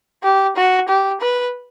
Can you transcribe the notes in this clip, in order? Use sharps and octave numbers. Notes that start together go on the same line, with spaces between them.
G4
F#4
G4
B4